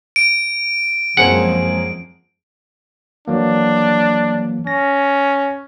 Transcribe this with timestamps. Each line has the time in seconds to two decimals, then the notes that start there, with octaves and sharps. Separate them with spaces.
0.16 D7
1.17 F#2 F3 G#3 A#3 C4 G#4 F#5
3.28 E3 F#3 A#3 D4
4.67 C#4 A#6